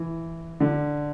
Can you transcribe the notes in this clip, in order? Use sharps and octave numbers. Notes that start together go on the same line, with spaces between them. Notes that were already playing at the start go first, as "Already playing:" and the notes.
Already playing: E3
D3